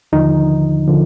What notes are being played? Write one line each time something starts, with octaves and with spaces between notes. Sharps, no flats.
D#2 D3 F3 D#4
D3 F3